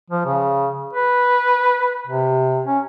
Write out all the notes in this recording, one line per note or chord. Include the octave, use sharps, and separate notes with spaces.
F3
C#3
B4
C3
C#4